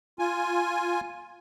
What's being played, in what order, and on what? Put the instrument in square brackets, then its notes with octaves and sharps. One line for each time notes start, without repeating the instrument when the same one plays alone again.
[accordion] F4 G#5